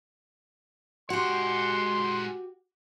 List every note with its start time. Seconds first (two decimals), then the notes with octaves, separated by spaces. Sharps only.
1.10 G#3 F#4 G4 F#5 C6